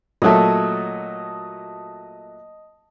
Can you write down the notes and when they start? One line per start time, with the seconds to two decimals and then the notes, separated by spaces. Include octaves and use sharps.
0.22 A#2 F#3 A3 D#5 A5